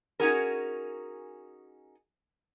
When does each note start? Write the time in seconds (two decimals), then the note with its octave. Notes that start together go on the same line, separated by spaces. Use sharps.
0.20 C#4 D#4 F#4 G#4 A#4